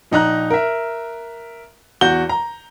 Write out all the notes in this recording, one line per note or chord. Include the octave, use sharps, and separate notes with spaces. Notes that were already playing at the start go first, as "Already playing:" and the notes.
A#1 D#4 A#5 F#6
A#4 E5
E2 F#4 G6 G7
A#5